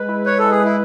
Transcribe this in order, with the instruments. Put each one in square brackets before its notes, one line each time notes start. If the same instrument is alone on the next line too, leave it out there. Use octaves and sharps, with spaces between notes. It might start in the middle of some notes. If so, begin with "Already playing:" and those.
Already playing: [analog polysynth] G#3 B4
E4
[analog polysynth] B4 [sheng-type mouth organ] C#5
[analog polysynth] G#3 [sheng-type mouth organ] A4
[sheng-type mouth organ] G#4
[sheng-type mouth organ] E4 [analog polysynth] B4